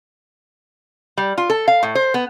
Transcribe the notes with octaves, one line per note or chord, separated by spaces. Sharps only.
G3
F4
A4
F5
A2
C5
B3